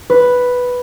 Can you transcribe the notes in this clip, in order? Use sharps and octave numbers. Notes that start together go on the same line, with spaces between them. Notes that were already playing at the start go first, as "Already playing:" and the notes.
B4